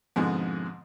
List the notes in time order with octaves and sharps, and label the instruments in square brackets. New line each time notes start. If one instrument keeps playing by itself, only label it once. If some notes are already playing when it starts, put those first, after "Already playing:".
[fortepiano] F2 G#2 B2 D3 G#3